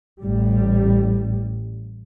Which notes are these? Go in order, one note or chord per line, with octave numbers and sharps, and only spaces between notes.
A1 G3